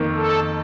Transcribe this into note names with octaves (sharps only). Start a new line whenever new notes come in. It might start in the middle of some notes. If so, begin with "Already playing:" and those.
Already playing: F2 D#3 A#3
A4